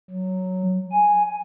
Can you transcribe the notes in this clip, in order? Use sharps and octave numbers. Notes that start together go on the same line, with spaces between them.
F#3
G#5